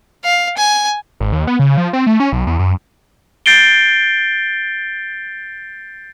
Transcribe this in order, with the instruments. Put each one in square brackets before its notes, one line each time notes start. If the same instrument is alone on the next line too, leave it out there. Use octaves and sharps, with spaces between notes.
[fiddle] F5
G#5
[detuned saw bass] G#1
D#2
B3
C#3
F3
C4
A3
C#4
B1
E2
F#2
[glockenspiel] G6 A6 C7 D7 G7